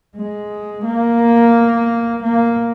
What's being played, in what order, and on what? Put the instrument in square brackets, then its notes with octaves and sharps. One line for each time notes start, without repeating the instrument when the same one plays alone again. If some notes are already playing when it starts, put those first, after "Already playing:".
[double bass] G#3
A#3
A#3